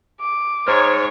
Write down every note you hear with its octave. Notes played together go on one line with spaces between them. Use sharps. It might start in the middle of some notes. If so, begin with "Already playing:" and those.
D6
G#2 C5 C#5 F6